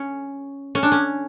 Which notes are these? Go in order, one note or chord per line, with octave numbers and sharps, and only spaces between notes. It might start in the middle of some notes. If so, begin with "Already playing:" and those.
Already playing: C#4
C#4
D4
C#4